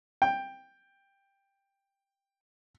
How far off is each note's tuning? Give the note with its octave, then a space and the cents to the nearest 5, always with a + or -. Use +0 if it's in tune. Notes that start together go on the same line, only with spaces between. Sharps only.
G5 +10